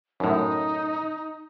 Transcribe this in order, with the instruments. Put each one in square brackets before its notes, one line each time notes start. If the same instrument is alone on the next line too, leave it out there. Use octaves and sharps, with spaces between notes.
[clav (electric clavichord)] F#2 A2 [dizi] D#4